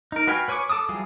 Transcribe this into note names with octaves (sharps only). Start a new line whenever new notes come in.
D#4 A#4
F#4 B4 F5 G5 G#5
B4 C#5 G#5 C#6 D6
A4 A5 D6 D#6
E3 F#3 G3 F4 G#4